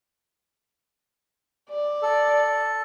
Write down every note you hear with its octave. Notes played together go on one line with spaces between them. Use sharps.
D5
A4